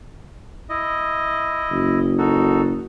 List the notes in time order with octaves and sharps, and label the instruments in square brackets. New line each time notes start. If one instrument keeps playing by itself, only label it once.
[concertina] E4 D#5
[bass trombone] F#1
[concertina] D#4 F#4 A4